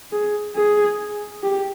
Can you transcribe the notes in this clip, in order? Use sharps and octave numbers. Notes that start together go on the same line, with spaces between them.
G#4
G#4
G4